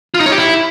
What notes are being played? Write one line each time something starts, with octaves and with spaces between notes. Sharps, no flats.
F4
D#4
C#5
G4
E4